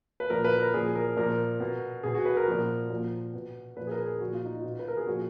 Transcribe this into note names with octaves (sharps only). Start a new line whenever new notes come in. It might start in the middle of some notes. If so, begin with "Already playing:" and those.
B4
A#2 F3 A#4
B4
A#4
A#2 F3 G#4
A#4
A#2 F3 A#4
B2
B2 G#4
F#4
B4
A#4
A#2 F3
A#2 F3
B2
A#2 F3 B4
G#4
A#4
G#4
A#2 F3 F#4
F4
D#4
B2 F4
B4
A#4
G#4
A#2 F3 F#4